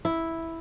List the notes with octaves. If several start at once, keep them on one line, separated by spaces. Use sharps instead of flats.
E4